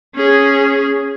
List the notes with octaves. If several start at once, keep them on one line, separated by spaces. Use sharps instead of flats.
C#4 G#4